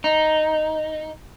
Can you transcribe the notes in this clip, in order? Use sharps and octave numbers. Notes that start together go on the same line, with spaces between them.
D#4